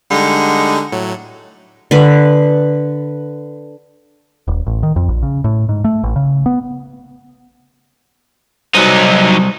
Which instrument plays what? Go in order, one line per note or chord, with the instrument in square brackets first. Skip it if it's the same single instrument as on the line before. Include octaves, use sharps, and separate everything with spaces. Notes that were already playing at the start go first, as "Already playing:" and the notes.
[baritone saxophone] D3 [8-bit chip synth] G3 G#3 D#4
[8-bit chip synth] A2 F#3
[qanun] D3 B4
[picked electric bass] D#1
A1
D#3
F2
A#1
C#3
A2
G#2
A3
A1
C#3
B3
[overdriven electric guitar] F#3 D#4 [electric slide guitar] G3 C5